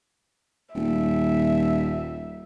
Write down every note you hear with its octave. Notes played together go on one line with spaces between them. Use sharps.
D#1 E5